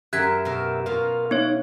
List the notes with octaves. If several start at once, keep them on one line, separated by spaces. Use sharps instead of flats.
F#2 G4 A#4 E5 F#6 G#6 B6
B2 A#4
B2 F4 A#4 F5
B3 D#4 C#5